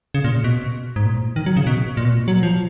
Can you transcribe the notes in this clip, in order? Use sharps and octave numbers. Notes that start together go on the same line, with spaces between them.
C#3
A#2
B2
G#2
A#2
D#3
F#3
C#3
B2
A#2
B2
A#2
F#3
F3